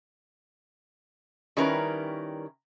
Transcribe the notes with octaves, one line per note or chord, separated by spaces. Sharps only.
D#3 G3 C#4 E4 A#4 B4